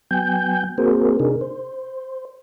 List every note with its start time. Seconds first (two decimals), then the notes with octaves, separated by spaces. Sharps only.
0.11 F#3 B3 G5 G#5 G6
0.78 A#3 C4 F#4 G#4 A#4 C5
1.20 C3 D4 D#4 G#4 A#4
1.41 C5